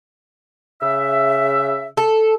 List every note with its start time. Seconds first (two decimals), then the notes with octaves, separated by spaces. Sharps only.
0.81 C#3 E5
1.97 A4